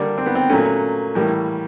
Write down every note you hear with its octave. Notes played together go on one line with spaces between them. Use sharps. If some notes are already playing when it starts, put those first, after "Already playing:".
Already playing: D3 G3 A#3 D4
C4
B3
C4
A#2 F#3 A3 C#4
A2 E3 G3 A#3